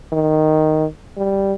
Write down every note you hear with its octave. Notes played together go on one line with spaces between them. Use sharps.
D#3
G3